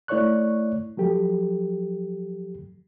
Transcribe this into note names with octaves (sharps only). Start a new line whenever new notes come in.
A3 E4 C#5 D5 C#6 F#6
F3 F#3 G4 A4